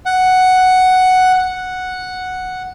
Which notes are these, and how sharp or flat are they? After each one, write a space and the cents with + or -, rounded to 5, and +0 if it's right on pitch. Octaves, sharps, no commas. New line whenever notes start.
F#5 +5
F#5 -5